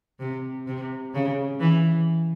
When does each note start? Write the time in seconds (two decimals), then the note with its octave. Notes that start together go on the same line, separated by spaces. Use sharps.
0.20 C3
0.67 C3
1.14 C#3
1.60 E3